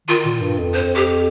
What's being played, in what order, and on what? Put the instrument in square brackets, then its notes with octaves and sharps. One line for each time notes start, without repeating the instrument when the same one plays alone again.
[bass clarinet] D#3 [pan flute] F4
[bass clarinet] A#2
G2
F2
[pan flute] C5
G4